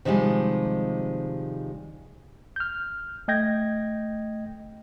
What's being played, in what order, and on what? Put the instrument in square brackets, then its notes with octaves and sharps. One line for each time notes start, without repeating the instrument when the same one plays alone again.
[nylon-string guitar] C3 D#3 F3 G3 G#3
[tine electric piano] F6 G6
A3 D#5 G5 G6 G#6 A#6